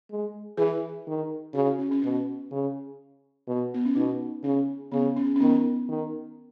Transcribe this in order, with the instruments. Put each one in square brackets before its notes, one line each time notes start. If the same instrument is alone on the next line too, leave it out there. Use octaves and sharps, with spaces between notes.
[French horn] G#3
[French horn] E3 [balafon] G#4
[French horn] D#3
[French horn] C#3 [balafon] F#4
[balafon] E4
C#4
C#4
[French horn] B2 [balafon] C#4
[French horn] C#3
B2
[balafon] B3
C#4
[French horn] B2 [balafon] D#4
[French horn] C#3 [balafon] C#4
[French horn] C#3 [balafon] B3
[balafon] C#4
C#4
[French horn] D#3 [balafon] B3
[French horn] D#3